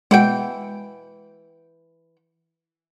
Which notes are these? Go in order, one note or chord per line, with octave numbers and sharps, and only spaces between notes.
B2 E3 G#3 F#5 G5